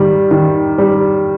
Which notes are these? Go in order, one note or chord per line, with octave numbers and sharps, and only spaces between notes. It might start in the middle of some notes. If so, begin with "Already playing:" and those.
Already playing: D#3 G3
D#3
G3